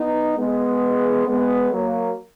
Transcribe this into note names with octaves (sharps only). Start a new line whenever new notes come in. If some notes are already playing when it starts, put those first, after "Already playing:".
Already playing: B3 D#4
G#3 B3
G#3 B3
F#3 A#3